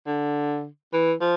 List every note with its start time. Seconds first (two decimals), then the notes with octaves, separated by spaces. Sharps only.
0.06 D3
0.93 E3
1.21 F3